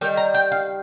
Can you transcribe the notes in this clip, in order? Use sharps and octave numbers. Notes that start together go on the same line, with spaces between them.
D#3 G3 G5
A#5
G5
F5